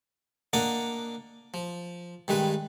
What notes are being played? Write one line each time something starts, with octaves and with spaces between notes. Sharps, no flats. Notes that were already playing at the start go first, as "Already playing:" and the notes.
A#3 D4 A#4 D#5 F5 F#5
F3
G2 D#3 G#3 B4